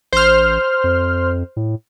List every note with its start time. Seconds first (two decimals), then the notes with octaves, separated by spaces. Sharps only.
0.13 A1 C5 F6
0.84 F2
1.56 A2